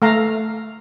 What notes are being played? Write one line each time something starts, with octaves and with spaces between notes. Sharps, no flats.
A3 F5 A#5